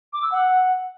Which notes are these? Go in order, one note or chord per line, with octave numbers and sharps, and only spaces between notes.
D6
E6
F#5